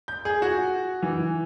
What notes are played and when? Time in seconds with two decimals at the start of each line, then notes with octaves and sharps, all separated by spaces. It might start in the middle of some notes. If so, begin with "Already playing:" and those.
0.08 G6
0.25 G#4
0.42 F#4
1.02 E3